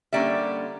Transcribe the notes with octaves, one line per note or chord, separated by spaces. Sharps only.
D3 G3 A#3 C#4 D5 E5